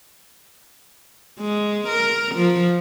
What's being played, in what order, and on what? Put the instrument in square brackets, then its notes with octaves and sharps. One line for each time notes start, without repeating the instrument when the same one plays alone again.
[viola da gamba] G#3
A#4
F3